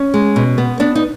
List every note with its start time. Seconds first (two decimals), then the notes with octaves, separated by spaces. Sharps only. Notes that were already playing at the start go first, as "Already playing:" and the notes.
Already playing: C#4
0.14 G#3
0.36 B2
0.58 B3
0.80 B3 D4
0.95 D#4